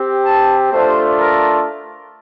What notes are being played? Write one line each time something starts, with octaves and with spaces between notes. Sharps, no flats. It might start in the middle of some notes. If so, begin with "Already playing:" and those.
Already playing: C4 G4
A5
A3 D4 F4 C5
A#4